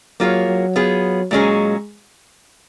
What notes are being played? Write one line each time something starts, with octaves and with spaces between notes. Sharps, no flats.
F#3 A#3 F4 G#4 C#5
F#3
B3 F4 G#4
A#2 F#3 G#3 C#4 G#4